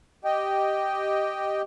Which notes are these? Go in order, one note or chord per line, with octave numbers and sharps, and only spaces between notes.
G4 D#5 G5